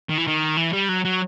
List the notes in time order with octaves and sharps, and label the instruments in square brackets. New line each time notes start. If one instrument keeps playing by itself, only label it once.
[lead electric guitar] D#3
E3
D#3
E3
G3
F#3
F#3